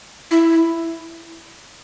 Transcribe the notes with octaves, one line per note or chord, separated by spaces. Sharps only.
E4